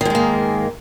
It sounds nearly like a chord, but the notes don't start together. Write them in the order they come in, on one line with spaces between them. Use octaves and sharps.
D#3 G#2 G#3 A#3